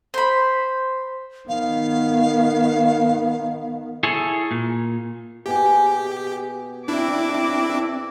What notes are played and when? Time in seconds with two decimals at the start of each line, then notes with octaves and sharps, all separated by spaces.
0.14 C5 B5
1.49 D#3 B3 F5
4.03 E4 G#4 A4 C#5
4.51 A#2
5.46 B2 G4 G#4
6.88 C4 D4 E4 D6